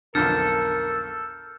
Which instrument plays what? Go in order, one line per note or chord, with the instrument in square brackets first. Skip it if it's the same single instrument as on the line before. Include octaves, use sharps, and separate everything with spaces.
[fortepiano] B1 F2 D3 [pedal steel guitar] A4 [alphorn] A#4 [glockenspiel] E6 F6 G6